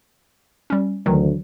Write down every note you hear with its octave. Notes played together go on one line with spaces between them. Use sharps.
G3 C#4
D2 D#3 E3 F#3